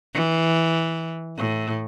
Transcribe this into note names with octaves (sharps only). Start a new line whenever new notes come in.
E3
A2